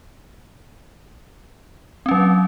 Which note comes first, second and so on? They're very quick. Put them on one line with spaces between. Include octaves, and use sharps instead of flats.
C4 C#4 F#3